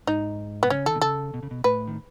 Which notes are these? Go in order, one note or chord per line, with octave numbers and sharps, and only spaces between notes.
G#2 D#4
B2 B3
C#3 C#4
D#3 A4
B2
C#3 A4
B2
C#3
B2
A2 B4
D#3